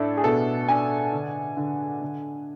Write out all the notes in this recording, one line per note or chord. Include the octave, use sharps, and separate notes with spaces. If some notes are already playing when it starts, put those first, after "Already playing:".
Already playing: A2 D4 A4
G#4
B2 A4
D4 G#5
D3
D3
D3